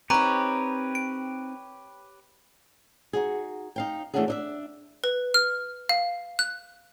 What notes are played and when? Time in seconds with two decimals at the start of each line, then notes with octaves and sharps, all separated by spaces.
0.10 C4 D#4 G4 B4 C#5 A#5
0.95 D7
3.13 D#4 F#4 G#4
3.76 D#4 F5 G5
4.14 E3 A3 C#4 D4 F#4 G#4
4.28 D4 D#5 E5
5.04 B4
5.34 F6
5.89 F5
6.39 F#6